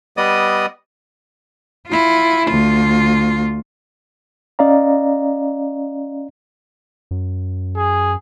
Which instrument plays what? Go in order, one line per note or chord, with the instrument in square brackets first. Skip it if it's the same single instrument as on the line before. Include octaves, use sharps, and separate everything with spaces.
[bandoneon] G3 B3 D5 D#5 D#6
[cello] E4 F4
D2 F4
[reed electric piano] C#4 D5 D#5 F5 A#5
[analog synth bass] F#2
[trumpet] G#4